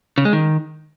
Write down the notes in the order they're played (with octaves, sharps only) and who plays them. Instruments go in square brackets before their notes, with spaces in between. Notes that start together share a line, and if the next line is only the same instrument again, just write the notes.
[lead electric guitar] C#3
G#3
D#3